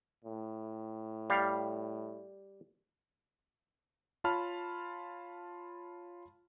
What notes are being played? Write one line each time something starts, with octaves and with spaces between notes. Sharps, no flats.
A2
G3 F5
F4 C#5 A5 B5 F6